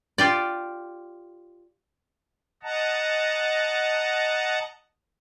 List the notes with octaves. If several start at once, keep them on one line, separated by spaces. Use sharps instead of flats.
F4 G4 D5
D#5 F#5 A5 A#5